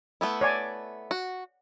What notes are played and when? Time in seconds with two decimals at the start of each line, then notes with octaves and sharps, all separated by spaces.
0.21 A3 B3 E4
0.41 C#5 D5 G#5
1.11 F#4